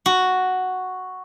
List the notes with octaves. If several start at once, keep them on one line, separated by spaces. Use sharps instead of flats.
F#4